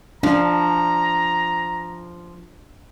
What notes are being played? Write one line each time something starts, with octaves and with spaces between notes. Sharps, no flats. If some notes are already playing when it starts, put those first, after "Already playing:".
F3 D4 A#5